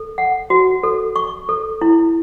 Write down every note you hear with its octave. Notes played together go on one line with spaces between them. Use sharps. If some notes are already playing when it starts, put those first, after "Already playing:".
Already playing: A4
F#5
F#4
A4
C#6
A4
E4